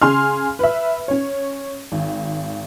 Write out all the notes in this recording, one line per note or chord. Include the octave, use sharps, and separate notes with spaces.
C#3 G#4 G#5 C6 F6
B4 E5
C#4 C#5
G#1